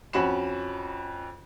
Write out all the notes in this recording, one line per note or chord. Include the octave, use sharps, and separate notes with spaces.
F2 C#4 F#4 B5 E7